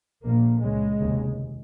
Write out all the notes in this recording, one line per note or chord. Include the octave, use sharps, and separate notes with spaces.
A#1 A#2 A#3
C#2 C#3 G#3
F1 D#2 C#3